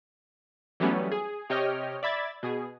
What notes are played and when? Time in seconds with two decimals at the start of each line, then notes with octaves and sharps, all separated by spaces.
0.80 E3 F#3 G3 A3 B3 C#4
1.12 G#4
1.50 C3 G4 C#5 D#5 G5 F6
2.03 D5 E5 B5 G#6 A6
2.43 B2 G#4